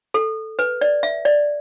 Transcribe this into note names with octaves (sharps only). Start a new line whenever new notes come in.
A4
B4
D5
E5
D5